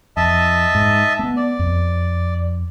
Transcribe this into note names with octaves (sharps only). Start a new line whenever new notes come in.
F2 D#5 E5 A5
G#2
A#3 B3
D5
F2